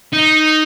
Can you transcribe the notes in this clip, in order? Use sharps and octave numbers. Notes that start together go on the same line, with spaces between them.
D#4